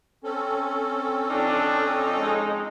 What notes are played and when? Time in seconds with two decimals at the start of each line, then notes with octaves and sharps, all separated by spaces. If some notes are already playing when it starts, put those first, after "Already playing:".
0.24 C4 C#4 A4
1.31 F2 D4 D#4
2.19 G#3